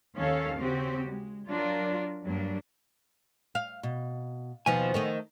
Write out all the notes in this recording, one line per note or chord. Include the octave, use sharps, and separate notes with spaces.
D#2 D#3 C#4 A4 C#5 F5
C#3 C4 F#4 G4
G#3
F#3 D4 F4 A#4
G2 F#3 A#3 D4
F5
B2
D#2 B2 F3 B3 G#5
D#3 A3 D#4